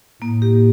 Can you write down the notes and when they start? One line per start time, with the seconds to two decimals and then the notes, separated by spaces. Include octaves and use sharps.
0.22 A2 A#3
0.42 G4